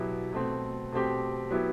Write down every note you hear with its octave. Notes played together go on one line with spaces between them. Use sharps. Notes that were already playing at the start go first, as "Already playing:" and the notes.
Already playing: B2 F#3 B3 E4 G4
B2 A3 C4
B2 A3 C4 G4
F#3 B3 E4 G4